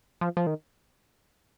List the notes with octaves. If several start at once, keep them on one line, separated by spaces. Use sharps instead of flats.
F3
F3
D#3